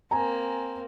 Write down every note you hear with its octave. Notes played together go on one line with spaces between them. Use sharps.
A#3 C4 G#5 A#5